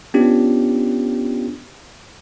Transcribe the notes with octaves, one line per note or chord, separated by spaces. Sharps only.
B3 C#4 D4 F4 G4